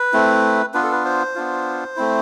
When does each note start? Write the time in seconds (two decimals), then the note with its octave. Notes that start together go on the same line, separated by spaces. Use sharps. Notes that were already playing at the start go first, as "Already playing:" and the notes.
Already playing: B4
0.13 A3 C4 E4
0.74 B3 D4 F4 B4
0.83 A4
0.92 B4
1.05 C5
1.35 B3 D4 F4
1.96 A3 C4 E4